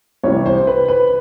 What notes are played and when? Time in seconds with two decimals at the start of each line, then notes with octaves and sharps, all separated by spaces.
0.23 C2 C3 E3 G3 C#5
0.46 C5
0.67 B4
0.88 B4